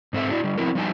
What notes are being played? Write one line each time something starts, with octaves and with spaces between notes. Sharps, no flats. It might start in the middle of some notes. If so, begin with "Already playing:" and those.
G#2 C4 D4 A4 E5
D4 E4 F#4
D3 G3
F3 B3 C4 E4 F#4 A#4
F3 G3 D#4 G#5 A5